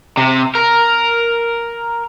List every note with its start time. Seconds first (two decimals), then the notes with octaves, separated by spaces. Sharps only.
0.17 C3
0.55 A#4